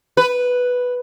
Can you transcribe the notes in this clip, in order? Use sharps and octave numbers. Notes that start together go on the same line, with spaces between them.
B4